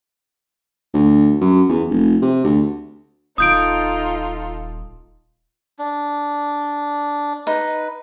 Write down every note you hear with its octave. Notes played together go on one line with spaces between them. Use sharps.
D2
F#2
E2
F1
C3
D2
D#1 D#4 F4 A4 D#6 G6 D7
D4
D#4 B4